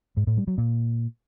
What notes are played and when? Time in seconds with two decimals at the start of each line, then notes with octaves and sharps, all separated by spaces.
0.17 G#2
0.27 A2
0.37 G3
0.48 F#3
0.58 A#2